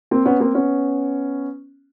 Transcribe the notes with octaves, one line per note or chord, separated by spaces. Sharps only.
A#3 C4
B3 C#4
A#3 C4
B3 C#4